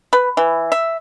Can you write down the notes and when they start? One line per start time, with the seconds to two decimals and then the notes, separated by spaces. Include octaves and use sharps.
0.13 B4
0.37 E3
0.72 E5